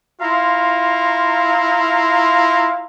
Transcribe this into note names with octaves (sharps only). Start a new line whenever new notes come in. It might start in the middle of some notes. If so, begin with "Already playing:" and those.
E4 F4 F5 A#5 C6